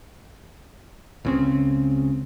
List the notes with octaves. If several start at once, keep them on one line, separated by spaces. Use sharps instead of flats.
C#2 C#3 C4